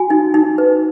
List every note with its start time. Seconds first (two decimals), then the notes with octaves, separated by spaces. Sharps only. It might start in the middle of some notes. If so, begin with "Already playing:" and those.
Already playing: F#4 G#5
0.10 D#4
0.34 D#4
0.58 B4